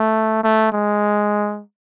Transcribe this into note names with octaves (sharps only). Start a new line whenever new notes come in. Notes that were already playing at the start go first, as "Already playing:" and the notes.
Already playing: A3
A3
G#3